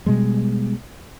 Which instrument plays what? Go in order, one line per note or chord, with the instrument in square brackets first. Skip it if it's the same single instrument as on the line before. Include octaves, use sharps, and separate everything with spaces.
[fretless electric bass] B2 G3 G#3